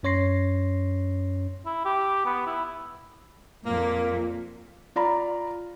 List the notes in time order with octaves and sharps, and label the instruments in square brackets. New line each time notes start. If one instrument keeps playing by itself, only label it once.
[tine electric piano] F#2 C#4 C#5 C6 A#6 C7
[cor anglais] E4
G4
B3
E4
[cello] F2 A#2 [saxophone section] A#3
[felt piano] F4 D5 A#5 B5